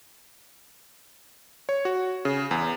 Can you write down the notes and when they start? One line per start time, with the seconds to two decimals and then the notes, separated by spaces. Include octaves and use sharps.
1.69 C#5
1.85 F#4
2.25 C#3
2.51 E2